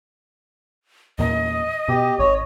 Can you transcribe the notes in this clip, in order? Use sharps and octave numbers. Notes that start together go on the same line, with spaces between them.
E2 A#2 D#5
B2 G4
G#1 C#5